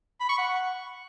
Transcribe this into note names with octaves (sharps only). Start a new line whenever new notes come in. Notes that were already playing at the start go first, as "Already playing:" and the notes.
B5
C#6
F#5